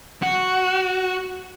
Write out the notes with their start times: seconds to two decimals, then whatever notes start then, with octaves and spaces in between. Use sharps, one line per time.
0.22 F#4